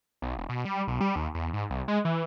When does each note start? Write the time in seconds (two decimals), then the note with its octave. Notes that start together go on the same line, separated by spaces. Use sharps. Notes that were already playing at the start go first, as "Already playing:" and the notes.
0.22 B1
0.37 E1
0.49 B2
0.65 G3
0.88 B1
1.01 G3
1.16 D#2
1.35 E2
1.53 G#2
1.70 C2
1.88 G#3
2.05 E3